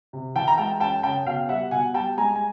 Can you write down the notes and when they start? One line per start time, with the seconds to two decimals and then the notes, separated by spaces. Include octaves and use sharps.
0.13 C3
0.35 E3 G5 A5
0.48 A#5
0.58 G#3 G5 A5
0.80 F#2 G5 A5
1.03 C#3 G5 A5
1.26 B2 F5 G5
1.49 G3 E5 F#5
1.71 B2 F#5 G#5
1.94 G3 G5 A5
2.17 G#3 G#5 A#5
2.35 G#5